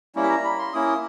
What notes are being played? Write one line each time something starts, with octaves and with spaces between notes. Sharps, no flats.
G3 A#3 C#4 E4
B5
A#5
B5
C6
A#3 C#4 E4 D#6